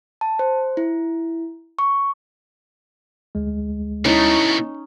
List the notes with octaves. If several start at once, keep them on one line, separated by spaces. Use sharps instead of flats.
A5
C5
E4
C#6
D2 G#3
B2 A3 C#4 D#4 E4 C#5